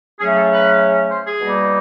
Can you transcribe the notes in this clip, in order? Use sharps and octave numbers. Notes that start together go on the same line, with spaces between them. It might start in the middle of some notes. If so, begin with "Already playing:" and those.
C#3 F#3 A3 C#4 G#4
A4
B4
C5
G#4
B2 G3 A#3 D#4